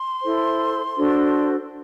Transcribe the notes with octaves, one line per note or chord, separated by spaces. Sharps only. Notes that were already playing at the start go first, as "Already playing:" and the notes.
Already playing: C6
E4 A4 C5
D4 F#4 A4 C5